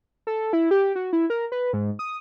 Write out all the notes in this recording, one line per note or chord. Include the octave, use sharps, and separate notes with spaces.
A4
E4
G4
F#4
E4
A#4
B4
G#2
D#6